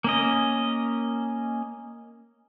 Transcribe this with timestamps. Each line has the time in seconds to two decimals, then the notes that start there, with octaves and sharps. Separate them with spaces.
0.04 A#3 C#4 D#5